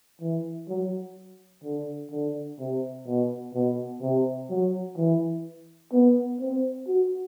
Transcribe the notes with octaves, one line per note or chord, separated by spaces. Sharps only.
E3
F#3
D3
D3
C3
B2
B2
C3
F#3
E3
B3
C4
F#4